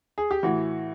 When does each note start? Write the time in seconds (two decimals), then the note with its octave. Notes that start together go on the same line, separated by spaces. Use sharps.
0.18 G#4
0.31 G4
0.43 A2 E3 F#4